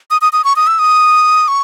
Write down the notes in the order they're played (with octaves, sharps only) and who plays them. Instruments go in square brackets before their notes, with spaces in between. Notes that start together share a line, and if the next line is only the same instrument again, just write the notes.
[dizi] D#6
D#6
D#6
C#6
D#6
E6
D#6
C#6